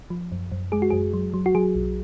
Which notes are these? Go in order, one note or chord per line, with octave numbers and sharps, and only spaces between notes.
F3
F#2
F#2
G#3 G#4
F#4
F#2 G#4
F#3
F#3
F#4
F#3 G#4
B1